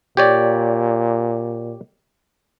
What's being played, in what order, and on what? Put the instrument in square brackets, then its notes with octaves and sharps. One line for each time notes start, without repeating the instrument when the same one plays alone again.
[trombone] A#2 [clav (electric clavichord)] G4 C#5 D5